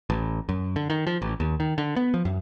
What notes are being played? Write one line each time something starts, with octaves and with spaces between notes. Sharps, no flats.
A1
F#2
D3
D#3
F3
A1
D#2
D#3
D3
B3
F3
F#2